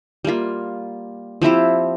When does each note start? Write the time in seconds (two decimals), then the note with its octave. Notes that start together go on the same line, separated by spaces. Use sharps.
0.25 G3 A#3 F4
1.42 F3 C4 E4 G4